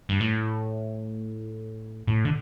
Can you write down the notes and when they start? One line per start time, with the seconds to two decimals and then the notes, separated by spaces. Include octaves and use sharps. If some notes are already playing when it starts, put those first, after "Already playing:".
0.09 G2
0.20 A2
2.07 A2
2.25 D3